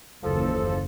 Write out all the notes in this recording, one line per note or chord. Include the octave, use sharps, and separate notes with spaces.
F#1 D#2 E3 F3 A4